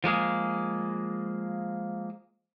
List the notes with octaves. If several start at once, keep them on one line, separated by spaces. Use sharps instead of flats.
F3 G#3 A#3 G#4